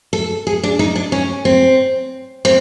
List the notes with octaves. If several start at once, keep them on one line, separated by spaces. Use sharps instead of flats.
A4
G#4
D4
D#4
D4
C#4
C4
C4